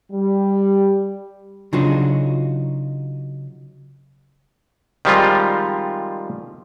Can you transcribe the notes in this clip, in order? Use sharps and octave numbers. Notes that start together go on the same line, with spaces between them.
G3
C#3 F#3 D4 D#4 F4 F#4
D#3 F3 G3 G#3 C4 F4